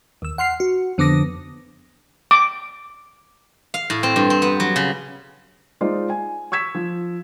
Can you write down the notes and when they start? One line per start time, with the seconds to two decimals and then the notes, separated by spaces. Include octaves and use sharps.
0.22 D#2 E6
0.38 F#5 C6 F6 C7
0.60 F#4
0.98 F2 D3 B3 D6 D#6 A#6
2.31 D6
3.74 F5
3.90 A2
4.03 C4
4.16 G2
4.30 C4
4.42 B3
4.60 F#3
4.76 C#3
5.81 G#3 D#4 F4 C5 D5
6.10 G#5
6.52 C#6 E6 G#6 B6 E7
6.75 F3